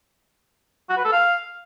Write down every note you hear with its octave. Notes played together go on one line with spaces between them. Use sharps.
F#4
B4
A4
F5